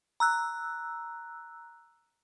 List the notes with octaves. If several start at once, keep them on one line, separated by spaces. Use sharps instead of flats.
A#5 E6 F#6